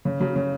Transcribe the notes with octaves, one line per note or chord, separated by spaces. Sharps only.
C#3
C#3 F#3
C#3